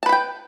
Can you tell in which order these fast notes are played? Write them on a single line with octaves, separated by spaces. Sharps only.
A5 B4 B5 G5